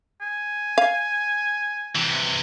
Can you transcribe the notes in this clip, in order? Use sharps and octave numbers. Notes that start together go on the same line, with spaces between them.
G#5
F5
C3 E3